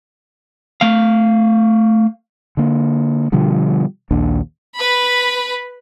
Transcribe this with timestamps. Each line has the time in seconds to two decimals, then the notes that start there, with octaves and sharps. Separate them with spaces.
0.81 A3 F5
2.57 D3 A#3
3.32 B2 D3 F3 G3
4.11 A#1 D#2 A#3 D4
4.75 B4 B5